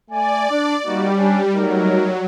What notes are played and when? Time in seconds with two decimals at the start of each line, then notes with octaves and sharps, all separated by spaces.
0.11 A3 D5 G#5
0.50 D4
0.86 G3 A#3 D#4 F#4
1.16 C#4 D4
1.54 F#3 A3 D#4 A#4